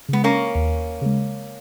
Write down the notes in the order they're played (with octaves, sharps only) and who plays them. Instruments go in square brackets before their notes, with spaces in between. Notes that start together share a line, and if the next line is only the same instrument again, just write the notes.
[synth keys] C#3 G#3 [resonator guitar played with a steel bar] B3
[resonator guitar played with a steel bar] A#3 C#4
[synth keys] D#2
C#3 G#3